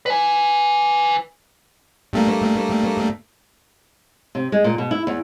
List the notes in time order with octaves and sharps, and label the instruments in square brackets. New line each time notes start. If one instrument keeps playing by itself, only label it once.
[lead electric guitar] B4 G#5
[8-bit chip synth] G2 A3 A#3
[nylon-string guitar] C3
G#3
A#2
B2
E4
E2